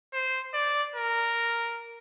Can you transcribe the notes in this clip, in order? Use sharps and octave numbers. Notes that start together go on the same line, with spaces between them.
C5
D5
A#4